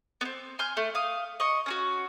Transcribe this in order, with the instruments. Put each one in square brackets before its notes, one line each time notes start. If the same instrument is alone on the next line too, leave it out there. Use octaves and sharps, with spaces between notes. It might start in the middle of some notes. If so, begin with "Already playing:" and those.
[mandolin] B3 C4
G#5 C6 F6 G6
A3
F5 D#6
D#5 C#6
C#4 D#4 F#4